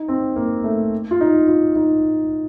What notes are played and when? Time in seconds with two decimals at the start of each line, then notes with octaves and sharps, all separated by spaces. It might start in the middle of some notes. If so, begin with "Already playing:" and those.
Already playing: D#4
0.08 C4
0.36 A#3
0.64 A3
1.11 F4
1.21 D#4
1.48 F4
1.75 D#4